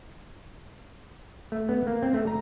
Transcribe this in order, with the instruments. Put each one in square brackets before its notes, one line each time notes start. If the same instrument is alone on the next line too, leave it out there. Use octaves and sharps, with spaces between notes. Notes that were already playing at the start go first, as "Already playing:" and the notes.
[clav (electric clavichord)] A3
B3
A#3
C4
A3
A#5